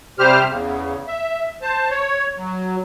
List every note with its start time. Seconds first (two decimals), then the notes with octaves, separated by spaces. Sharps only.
0.19 C3 G3 G4 C5 F6
0.49 E2 C#3
1.07 E5
1.62 C5 A5
1.90 C#5
2.37 F#3